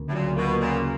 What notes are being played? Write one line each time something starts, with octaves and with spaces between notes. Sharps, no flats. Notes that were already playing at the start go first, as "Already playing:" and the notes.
Already playing: D2 C#3 A#3
A2
A#2 F#3
B2 A#3
A#2 C#3